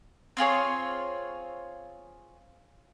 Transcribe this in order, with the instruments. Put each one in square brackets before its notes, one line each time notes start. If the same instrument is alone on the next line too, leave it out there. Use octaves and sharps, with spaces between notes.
[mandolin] C4 F4 G#4 C#5